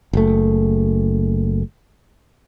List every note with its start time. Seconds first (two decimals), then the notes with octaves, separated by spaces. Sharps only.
0.13 F#1 A3